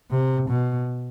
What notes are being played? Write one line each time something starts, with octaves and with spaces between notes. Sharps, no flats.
C3
B2